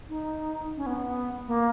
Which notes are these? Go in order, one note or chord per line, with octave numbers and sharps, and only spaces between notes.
D#4
C#4
B3
A#3